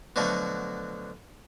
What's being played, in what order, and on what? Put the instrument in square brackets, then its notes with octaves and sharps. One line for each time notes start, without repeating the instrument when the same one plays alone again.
[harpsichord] B2 D3 F3 F#3 A3